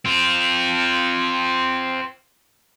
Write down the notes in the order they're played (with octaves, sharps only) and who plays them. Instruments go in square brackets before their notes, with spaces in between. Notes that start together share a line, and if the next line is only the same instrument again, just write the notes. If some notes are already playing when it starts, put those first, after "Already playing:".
[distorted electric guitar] C4 F4